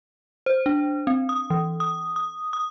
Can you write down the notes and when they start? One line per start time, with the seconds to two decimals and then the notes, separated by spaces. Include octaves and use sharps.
0.46 C5
0.66 D4
1.07 C4
1.29 D#6
1.50 E3
1.80 D#6
2.16 D#6
2.53 D#6